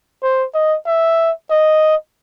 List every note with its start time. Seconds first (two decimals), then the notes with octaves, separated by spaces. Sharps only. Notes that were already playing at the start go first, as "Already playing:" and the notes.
0.23 C5
0.54 D#5
0.86 E5
1.50 D#5